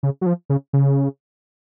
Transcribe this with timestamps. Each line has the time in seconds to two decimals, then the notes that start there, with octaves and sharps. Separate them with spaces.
0.03 C#3
0.21 F#3
0.26 F3
0.50 C#3
0.73 C#3